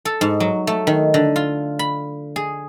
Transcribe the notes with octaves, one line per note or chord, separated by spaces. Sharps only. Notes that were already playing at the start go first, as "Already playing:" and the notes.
A4
G#2
F#3
A3
D#3
D3
F4
B5
G#4